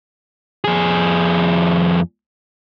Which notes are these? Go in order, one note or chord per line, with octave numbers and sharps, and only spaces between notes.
F2 G#4